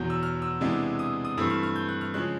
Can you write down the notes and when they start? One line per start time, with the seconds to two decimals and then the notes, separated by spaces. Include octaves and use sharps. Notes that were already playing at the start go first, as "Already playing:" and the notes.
Already playing: E2 B2 F#3 G6
0.10 E6
0.23 F6
0.42 E6
0.61 C3 E3 G#3 B3 D4
0.99 D#6
1.25 D#6
1.37 G2 E3 A3 C4 E6
1.50 F6
1.63 F6
1.76 G6
1.88 F#6
2.01 F6
2.14 C#3 F3 G#3 C#4 F#6